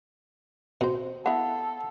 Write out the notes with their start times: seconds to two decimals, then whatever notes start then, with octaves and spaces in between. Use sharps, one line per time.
0.81 B2 C4 C5
1.26 B3 E4 A4 F5 F#5 B5